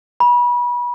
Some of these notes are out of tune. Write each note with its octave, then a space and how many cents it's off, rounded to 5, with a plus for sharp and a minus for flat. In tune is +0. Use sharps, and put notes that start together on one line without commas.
B5 -30